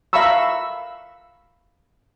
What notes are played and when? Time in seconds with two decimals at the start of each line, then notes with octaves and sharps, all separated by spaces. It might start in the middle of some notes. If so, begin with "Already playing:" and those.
0.13 E5 F5 A#5 B5 C#6 E6